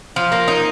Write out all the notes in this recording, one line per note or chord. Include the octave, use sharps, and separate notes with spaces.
F3
A#3
D#4